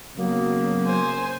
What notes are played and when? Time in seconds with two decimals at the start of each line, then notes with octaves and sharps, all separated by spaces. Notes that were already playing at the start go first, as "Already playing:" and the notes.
0.17 C#3 F#3 A#3 B3
0.86 C5 G#5